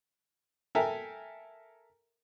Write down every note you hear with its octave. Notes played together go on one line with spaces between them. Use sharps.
A4 A#4 E5 G5 G#5